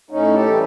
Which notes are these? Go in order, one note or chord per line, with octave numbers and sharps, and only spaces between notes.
A2 C#4 D#4
G4 A4
E3 G3